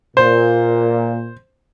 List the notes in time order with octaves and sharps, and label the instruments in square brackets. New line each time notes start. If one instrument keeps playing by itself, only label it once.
[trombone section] A#2 [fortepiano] C5